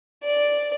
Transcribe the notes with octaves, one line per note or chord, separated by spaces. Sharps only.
D5